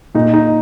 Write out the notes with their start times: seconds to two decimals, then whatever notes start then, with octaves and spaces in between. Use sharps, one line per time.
0.15 A#2 D#4
0.34 D#4